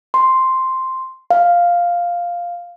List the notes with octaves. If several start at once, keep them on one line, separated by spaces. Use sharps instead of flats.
C6
F5